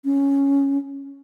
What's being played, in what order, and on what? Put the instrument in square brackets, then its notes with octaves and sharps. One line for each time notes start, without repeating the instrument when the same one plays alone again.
[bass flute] C#4